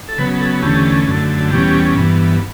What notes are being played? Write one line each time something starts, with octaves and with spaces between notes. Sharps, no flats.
A4
C#3 F#3 B3 B4
A4
E2 D3 A3 C#4 G4
F#2 D3 A3
E2 B2 G3 C#4 G4
G2 E3 B3